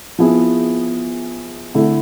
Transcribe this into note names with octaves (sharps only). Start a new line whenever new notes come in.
F3 B3 E4 G#4
D3 A3 E4